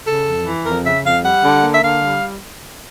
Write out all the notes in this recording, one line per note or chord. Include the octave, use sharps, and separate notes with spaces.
C#3 A4
F2
E3
F2 A#4
C#3 E5
F2 F5
G3 F#5
D3
A#3
E5
D3 F5
G3